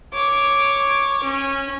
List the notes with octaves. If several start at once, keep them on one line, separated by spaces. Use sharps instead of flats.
C#5 D6
C#4